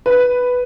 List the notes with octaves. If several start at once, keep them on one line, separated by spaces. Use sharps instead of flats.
B4